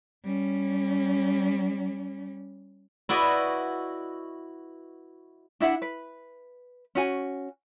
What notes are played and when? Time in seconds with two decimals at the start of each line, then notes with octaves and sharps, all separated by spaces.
0.25 G3 C#4
3.09 E4 F#4 B4 D5 D#5
5.60 D4 E4 E5 F#5
5.82 B4
6.95 C#4 F#4 G#5